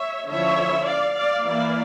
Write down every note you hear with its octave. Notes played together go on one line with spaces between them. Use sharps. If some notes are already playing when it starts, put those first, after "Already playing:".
Already playing: C#5 E5
D3 F3 C#4 E4 C#5 E5
D5 F5
D5 F5
E3 A#3 E4 D5 F5